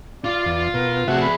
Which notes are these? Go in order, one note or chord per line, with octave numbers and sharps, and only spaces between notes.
F4 D5 F5
E2
B2 A#4
C3 A3 F#4 G#4 E5 F#5
B5